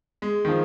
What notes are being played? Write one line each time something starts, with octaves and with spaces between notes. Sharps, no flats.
G#3
D#3
F3